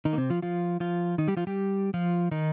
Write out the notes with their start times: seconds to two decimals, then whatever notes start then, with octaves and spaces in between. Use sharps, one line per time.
0.05 D#3 D#4
0.13 A#3
0.18 C3 C4
0.30 F3 F4
0.42 F3 F4
0.80 F3 F4
1.18 D#3 D#4
1.28 G3 G4
1.37 F3 F4
1.47 G3 G4
1.94 F3 F4
2.31 D#3 D#4